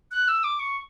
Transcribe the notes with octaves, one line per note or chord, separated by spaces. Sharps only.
F#6
E6
D6
C#6